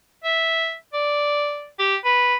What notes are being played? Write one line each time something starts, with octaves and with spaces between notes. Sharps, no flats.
E5
D5
G4
B4